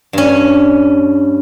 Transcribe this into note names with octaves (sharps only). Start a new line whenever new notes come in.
G2 C#4